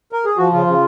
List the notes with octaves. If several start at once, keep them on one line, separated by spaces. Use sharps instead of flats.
A#4
G#4
F3 F#4
C#3 F4
C#3